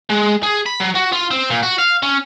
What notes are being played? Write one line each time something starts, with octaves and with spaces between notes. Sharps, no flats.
G#3
G#4
B5
F#3
F#4
F4
C4
A#2
F#4
F5
C#4